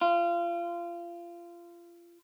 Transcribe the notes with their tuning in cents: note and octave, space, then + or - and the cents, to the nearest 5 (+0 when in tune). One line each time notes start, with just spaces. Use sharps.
F4 -25